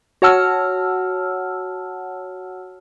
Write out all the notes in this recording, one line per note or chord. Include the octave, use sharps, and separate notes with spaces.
F#4 C#5 F#5 A5 E6 F6